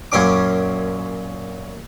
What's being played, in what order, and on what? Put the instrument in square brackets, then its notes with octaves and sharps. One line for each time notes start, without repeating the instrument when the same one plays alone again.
[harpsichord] F#2 A#2 C#4 D6